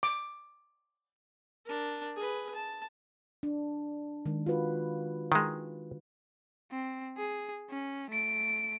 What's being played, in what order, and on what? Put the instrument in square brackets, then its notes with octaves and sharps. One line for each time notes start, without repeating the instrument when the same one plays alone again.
[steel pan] D6
[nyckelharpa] D4 A#4
G#4 B4
A5
[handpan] D4
D#3 G#3
F4 F#4 B4
[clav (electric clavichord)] D#3 G#3
[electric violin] C4
G#4
C#4
A3 D7